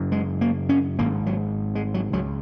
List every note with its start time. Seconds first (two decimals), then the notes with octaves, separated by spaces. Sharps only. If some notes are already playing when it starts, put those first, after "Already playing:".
Already playing: F#1 F#2 C#3
0.12 G#3
0.41 A#3
0.69 C#4
0.98 G#1 G#2 A#3
1.26 F#3
1.75 G#3
1.94 F#3
2.13 C#2 C#3 F#3